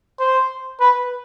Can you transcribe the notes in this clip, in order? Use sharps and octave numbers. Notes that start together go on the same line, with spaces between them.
C5
B4